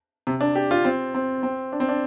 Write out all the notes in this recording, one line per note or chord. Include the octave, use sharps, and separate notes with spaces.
C3
D4
G4
F4
C4
C4
C4
D4
C4
D4